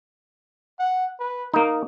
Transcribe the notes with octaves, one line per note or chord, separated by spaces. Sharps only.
F#5
B4
A#3 D#4 A#4